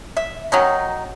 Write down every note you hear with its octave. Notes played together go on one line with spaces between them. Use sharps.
E5
D#3 F#3 C#4 D#4